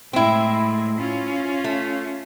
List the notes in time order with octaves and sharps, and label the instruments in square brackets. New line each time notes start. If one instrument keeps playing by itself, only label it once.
[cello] A2 G#3 [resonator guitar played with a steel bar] C4 E4
[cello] C#4 F4
[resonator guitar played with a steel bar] A3